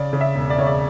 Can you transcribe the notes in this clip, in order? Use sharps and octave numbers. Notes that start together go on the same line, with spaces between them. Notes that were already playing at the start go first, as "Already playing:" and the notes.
Already playing: C#3 D5
C#3
E5
E1
D5
C#3 C#5
D5